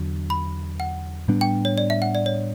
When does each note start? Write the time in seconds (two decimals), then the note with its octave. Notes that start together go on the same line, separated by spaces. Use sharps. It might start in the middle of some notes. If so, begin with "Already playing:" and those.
Already playing: E2 D3 F#3
0.30 B5
0.80 F#5
1.28 A2 G3 B3 D4
1.41 G5
1.65 C#5
1.78 D5
1.90 E5
2.02 F#5
2.15 D5
2.26 C#5